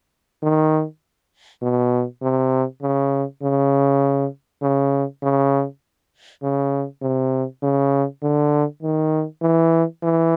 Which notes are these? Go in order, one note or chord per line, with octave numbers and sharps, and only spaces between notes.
D#3
B2
C3
C#3
C#3
C#3
C#3
C#3
C3
C#3
D3
D#3
E3
E3